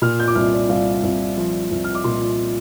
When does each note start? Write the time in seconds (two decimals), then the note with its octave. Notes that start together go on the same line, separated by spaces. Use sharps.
0.02 A#2 F6
0.20 G6
0.28 D6
0.35 C2 F6
0.53 D5
0.69 C2 F5
1.03 C2
1.37 F3
1.71 C2
1.84 F6
1.95 D6
2.04 A#2 C6